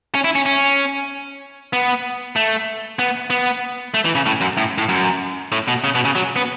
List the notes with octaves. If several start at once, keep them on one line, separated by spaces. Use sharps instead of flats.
C#4
E4
C#4
C#4
B3
A3
B3
B3
A3
E3
C#3
A2
F#2
A2
A2
F#2
A2
B2
C#3
B2
C#3
F#3
B3